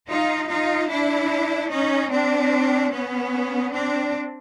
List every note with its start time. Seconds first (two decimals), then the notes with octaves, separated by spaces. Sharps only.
0.09 D#4 F4
0.49 D#4 F4
0.90 D4 E4
1.71 C#4 D#4
2.11 C4 D4
2.92 B3 C#4
3.72 C4 D4